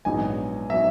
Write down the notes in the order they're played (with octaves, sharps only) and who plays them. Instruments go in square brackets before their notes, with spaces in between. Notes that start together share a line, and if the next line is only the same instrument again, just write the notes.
[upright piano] A#1 G#2 F#3 B3 D#4 [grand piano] G#5
[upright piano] F#3 B3 D#4 [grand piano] E5